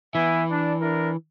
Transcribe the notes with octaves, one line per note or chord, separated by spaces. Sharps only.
E3 B3 E5 G#5
D4
D4 E4 A#4